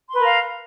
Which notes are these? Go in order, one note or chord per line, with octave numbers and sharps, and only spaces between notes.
A#4 B4 F5 C6